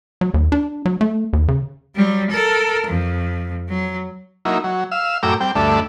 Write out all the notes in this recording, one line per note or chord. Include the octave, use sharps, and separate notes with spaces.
F#3
D#2
D4
F#3
A3
D#2
C#3
F#3 G3
A4 A#4
F2
F#3
F#3 A#3 D#4 E4
F#3
F5 E6
F#2 A2 G5 A#5 D6 E6
G3 C4 G5
D2 G2 A3 D5 E5